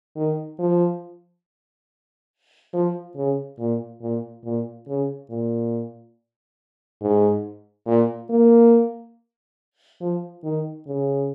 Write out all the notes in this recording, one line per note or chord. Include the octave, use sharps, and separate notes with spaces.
D#3
F3
F3
C#3
A#2
A#2
A#2
C#3
A#2
G#2
A#2
A#3
F3
D#3
C#3